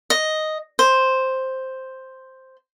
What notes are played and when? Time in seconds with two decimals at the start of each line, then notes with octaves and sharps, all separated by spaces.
0.10 D#5
0.79 C5